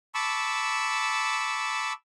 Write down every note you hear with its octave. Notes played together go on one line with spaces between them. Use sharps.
A5 B5 C#6 D6 E6